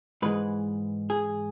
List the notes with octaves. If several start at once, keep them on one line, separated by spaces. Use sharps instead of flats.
G#2 E3 G#3 B4
G#4